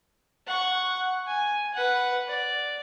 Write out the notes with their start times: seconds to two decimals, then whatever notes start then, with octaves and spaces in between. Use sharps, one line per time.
0.47 F#5 C#6
1.27 G#5
1.74 B4 F#5
2.28 D5